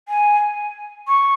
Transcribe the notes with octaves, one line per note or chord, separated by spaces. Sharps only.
G#5
C#6